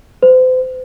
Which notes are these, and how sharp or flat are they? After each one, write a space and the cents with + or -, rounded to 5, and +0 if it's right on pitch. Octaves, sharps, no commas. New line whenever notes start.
C5 -40